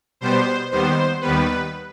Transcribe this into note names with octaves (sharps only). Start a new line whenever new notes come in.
B2 G3 B3 C5
D#2 D#3 G3 B3 C5
D#2 D#3 G3 B3 B4